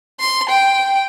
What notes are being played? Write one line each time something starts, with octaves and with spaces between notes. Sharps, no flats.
C6
G5